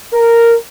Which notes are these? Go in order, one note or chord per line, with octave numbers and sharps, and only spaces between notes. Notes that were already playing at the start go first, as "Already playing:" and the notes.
A#4